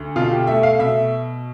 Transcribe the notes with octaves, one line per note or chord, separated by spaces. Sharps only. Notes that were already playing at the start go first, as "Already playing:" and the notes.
Already playing: D2
B2 F4
G4
A3 E5
F5
B2 E5